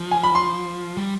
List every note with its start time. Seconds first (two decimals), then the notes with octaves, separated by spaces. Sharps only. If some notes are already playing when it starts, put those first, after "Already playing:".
Already playing: F3
0.11 G#5
0.23 B5
0.35 C6
0.97 G3